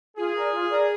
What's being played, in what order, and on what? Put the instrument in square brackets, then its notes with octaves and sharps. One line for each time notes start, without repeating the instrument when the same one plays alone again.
[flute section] F4 [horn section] G#4
[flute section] A#4 D5
F4
A#4 D5